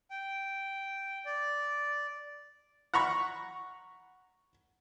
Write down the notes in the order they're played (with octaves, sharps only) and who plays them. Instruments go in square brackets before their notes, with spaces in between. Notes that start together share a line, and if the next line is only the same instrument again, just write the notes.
[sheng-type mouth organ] G5
D5
[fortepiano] F#5 A#5 B5 C#6